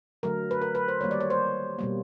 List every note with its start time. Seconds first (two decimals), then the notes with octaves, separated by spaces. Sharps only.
0.23 D3 F#3 A3 A#4
0.51 B4
0.62 A#4
0.75 B4
0.88 C5
1.01 D#3 G3 A#3 C#5
1.11 D5
1.20 C#5
1.30 C5
1.79 B2 G3 A#3